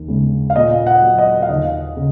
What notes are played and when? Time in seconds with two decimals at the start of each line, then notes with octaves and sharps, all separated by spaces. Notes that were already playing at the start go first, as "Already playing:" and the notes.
Already playing: D#2
0.08 C#3 G#3
0.50 F5
0.56 A#2 D#5
0.87 F#5
1.02 F#3
1.18 D#5
1.42 F5
1.49 D#2 D#5
1.96 C#3